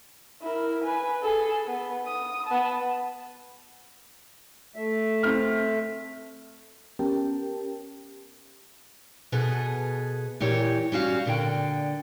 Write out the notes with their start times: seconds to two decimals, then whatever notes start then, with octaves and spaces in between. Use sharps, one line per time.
0.42 E4 A#4
0.84 B4 G#5
1.22 G#4 A4
1.67 B3
2.07 D#6
2.47 B3 A5
4.76 A3 E5
5.23 C4 F6
6.99 B3 C#4 G4 A#4 G5 A5
9.32 B2 B3 G#4 A4
10.40 A#2 E3 G4 C#5
10.92 G3 C#4 F#4 F5
11.25 A#2 D3 G5